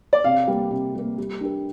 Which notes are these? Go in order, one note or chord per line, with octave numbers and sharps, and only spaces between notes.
D5
C3 F5
G3 A#3
C3
G3 A#3
G3
D4 G4 A#4